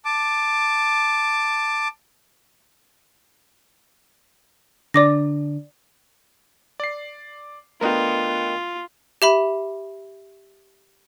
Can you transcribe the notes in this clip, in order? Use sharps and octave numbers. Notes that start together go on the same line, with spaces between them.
A5 D6
D3 D4 D5 D6 A#6
D5 C7
A3 B3 D4 F4 A#4 D#5 G5
G4 E5 B5